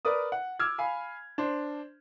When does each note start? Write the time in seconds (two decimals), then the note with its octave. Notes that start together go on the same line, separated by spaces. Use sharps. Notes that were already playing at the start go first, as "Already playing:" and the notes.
0.05 A#4 B4 D5 D#6
0.32 F#5
0.60 D6 E6 F6 G#6
0.78 F5 G#5 B5
1.38 D4 C5